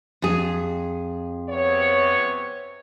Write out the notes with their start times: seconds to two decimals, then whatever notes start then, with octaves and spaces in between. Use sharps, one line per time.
0.22 F2 G#4
1.49 C3 B3 C#5